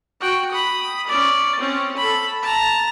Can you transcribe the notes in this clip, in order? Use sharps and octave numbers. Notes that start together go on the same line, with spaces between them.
F#4 G5
B5 D#6
C#4 D5
C4 C#4
A4 B5
A5 A#5